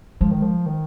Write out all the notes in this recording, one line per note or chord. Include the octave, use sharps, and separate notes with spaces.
F3 G#3
D#3
F3
D#3